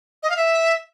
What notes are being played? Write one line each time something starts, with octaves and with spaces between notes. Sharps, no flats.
D#5
F5
E5